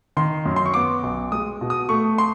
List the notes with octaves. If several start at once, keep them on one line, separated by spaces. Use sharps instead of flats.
D#3 C6
F#2
C6
C#6
B3 D6
B1
G#3 D#6
B2
D#6
A3 C#6
C6